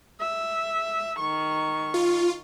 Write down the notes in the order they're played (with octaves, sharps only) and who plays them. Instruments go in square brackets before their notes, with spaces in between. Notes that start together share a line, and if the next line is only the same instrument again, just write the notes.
[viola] E5
D#3 C#6
[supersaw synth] F4